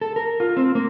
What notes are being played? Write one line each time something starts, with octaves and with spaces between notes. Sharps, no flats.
A4
A#4
F4
C4
A#3